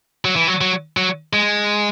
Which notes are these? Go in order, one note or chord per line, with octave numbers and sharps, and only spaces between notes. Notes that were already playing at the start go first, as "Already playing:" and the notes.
F#3
E3
F#3
F#3
F#3
G#3